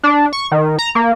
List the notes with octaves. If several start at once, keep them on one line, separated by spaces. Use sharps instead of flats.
D4
C#6
D#3
A#5
A#3